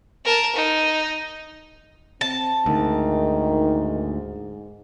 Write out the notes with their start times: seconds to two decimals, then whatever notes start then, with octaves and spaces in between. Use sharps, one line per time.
0.25 A#4 A5
0.55 D#4
2.21 C4 A5
2.66 D2 G#2 D#3